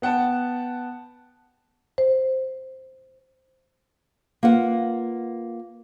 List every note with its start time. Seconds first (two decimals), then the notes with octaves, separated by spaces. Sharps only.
0.02 B3 F#5 G5 A5
1.98 C5
4.43 A#3 F4 B4 F#5